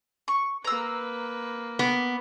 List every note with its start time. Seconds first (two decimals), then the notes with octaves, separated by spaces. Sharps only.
0.28 C#6
0.65 A#3 B4 A#5 E6
1.79 B3 D6